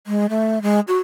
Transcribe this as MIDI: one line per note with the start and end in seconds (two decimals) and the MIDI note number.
0.07 0.27 56
0.30 0.62 57
0.62 0.80 56
0.88 0.98 66